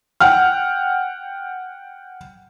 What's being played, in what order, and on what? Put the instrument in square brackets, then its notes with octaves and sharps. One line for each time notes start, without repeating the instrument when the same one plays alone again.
[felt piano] F#5 G5 F6